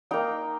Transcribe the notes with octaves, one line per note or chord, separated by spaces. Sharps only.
A#3 D#4 G5 A#5